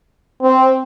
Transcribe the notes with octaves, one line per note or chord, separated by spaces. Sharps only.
C4